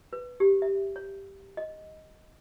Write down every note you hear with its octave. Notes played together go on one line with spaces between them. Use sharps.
B4
G4
E5
C#5
D#5